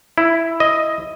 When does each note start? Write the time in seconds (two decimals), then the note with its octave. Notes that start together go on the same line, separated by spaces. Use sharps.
0.18 E4
0.60 D#5